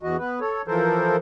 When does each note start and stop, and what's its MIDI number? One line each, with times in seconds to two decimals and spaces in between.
0.03 0.17 40
0.03 0.17 52
0.03 0.17 66
0.03 0.17 75
0.19 0.39 59
0.19 0.39 71
0.41 0.62 69
0.41 0.62 73
0.68 1.16 52
0.68 1.16 53
0.68 1.16 69
0.68 1.16 70
0.68 1.16 72